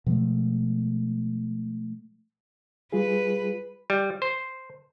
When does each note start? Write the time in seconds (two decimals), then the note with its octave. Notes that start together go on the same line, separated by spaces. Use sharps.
0.07 B2 F3 G#3 A3
2.93 G3 F4 G#4 B4
3.90 G3
4.22 C5